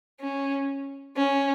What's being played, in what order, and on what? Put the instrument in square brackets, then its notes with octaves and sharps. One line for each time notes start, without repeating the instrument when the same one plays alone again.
[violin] C#4
C#4